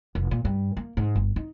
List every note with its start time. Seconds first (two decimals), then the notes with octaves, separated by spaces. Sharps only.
0.15 F1
0.31 A#2
0.45 G2
0.77 A#3
0.97 G#2
1.16 G1
1.36 D#4